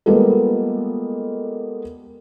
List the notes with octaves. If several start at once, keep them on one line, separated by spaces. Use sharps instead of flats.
G3 G#3 A#3 B3 F4 A4